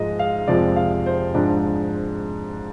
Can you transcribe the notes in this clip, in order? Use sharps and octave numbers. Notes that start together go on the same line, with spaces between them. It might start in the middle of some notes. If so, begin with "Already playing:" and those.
Already playing: G#2 F3 G#3 D#5
F5
F2 C3 F3 G#3 D5
F5
C5
G#2 F3 G#3 D4